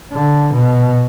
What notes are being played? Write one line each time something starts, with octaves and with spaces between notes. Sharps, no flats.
D3
B2